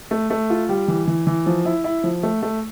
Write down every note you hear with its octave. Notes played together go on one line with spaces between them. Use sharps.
A3
A3
F4
G3
E3
E3
E3
F3
E4
E4
F3
A3
A3